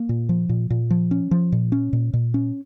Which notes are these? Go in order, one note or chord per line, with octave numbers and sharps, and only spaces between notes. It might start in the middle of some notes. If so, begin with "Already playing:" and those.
Already playing: A#3
A#2
F3
A#2
A#2
F3
C#4
F3
A#2
C#4
A#2
A#2
C#4